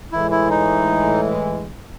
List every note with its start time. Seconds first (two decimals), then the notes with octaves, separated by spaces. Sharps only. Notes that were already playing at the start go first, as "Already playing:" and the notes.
0.12 A2 E3 G#3 E4
0.31 E4
0.50 D#4